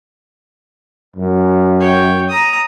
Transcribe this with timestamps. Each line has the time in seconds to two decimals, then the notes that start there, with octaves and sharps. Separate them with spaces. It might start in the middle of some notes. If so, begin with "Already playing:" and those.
1.16 F#2
1.80 C#5 G5
2.29 A#5 D#6